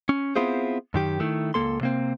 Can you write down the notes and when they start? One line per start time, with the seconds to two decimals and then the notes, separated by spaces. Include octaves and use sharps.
0.09 C#4
0.36 B3 C4 E4 F4 G#4 C5
0.94 F#2 D#3 G4
1.20 D#3 A3 E4
1.54 C#2 A#3 A4 C6
1.81 C3 A#3 C4